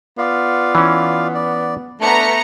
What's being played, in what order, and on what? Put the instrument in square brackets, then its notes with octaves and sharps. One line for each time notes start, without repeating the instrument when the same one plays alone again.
[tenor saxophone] B3 [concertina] F4 D5 F5
[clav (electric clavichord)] E3 C#4
[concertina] D5
[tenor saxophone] A3 [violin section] B3 A#5 C#7 [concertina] D4